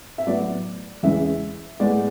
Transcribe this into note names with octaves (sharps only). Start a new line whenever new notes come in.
E5
A2 F#3 B3 D5
E2 C#3 E3 G#3 E5
A2 G#3 B3 D5